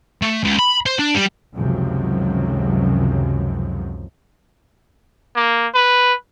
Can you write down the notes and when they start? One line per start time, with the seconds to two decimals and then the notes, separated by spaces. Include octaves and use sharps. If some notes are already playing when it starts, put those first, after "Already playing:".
0.22 A3
0.44 C#2
0.59 B5
0.86 C5
0.99 D4
1.14 G3
1.55 C#2 F#2 C3 D#3 F3 F#3
5.35 A#3
5.74 B4